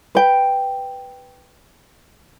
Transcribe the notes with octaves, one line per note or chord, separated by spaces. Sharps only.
B4 G5